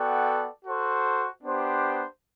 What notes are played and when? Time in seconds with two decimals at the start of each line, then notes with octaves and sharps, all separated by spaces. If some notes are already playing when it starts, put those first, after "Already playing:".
Already playing: B3 F#4 A4 D5 G5
0.64 F#4 A4 C5
1.43 B3 D4 G4 C5